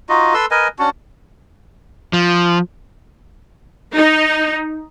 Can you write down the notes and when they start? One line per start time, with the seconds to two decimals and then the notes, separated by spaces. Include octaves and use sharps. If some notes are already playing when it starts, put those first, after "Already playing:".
0.09 D#4 F4 F#4 D#5
0.34 A4 B4 C6 E6
0.51 A#4 B4 D#5 G#5
0.79 C#4 D4 F#4
2.13 F3
3.95 D#4